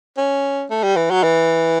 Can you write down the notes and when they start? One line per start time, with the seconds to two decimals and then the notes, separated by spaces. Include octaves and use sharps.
0.18 C#4
0.71 A3
0.84 G3
0.96 E3
1.11 F#3
1.24 E3